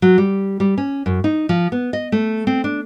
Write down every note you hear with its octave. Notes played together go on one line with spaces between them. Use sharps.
F#3
G3
G3
C#4
F#2
D#4
F3
B3
D#5
A3
C4
D4